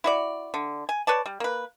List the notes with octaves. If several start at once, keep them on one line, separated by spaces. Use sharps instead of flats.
E4 F#4 D5
D3
G#5
B4 C#5 D5 A5
G3
A#3 B4